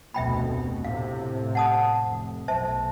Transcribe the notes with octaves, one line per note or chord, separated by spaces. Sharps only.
F1 D2 B2 E5 G5 B5
A2 C3 F5
F#5 A5 D#6
F1
B1 C5 E5 A5